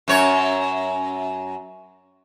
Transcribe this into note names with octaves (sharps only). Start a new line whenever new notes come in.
F#2 C#5